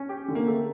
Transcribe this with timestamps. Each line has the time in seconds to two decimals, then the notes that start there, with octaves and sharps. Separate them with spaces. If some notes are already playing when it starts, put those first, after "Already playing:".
Already playing: C#4
0.09 G4
0.28 D3
0.35 A#3
0.48 A3